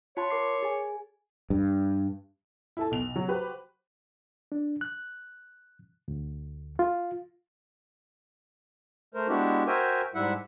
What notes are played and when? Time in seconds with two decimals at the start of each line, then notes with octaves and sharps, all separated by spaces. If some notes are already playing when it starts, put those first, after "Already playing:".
0.17 F4 C#5 A5 C6
0.30 A#4 D6 C7
0.63 G#4 G#5
1.50 G2
2.77 E4 A4 A5
2.91 B1 F7
3.16 F#3
3.28 F#4 G4 B4 C5
4.52 D4
4.81 F#6
6.08 D2
6.79 F4
9.14 A3 A#4 C5
9.28 G#3 B3 D4 E4 F#4 G4
9.67 F#4 A#4 C5 E5 G5 G#5
10.15 G#2 G3 E4 E5 F#5